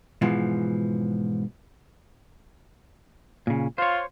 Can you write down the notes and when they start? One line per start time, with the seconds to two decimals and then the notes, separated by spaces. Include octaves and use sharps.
0.22 G#2 B2 E3 F3
3.47 A#2 C#3
3.78 F4 C5 C#5